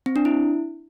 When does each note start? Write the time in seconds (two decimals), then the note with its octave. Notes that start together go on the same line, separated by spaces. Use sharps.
0.06 C4
0.16 D4
0.25 E4